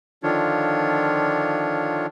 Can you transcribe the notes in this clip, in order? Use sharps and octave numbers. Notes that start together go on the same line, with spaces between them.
D3 D#3 F3 D4 F4 C#5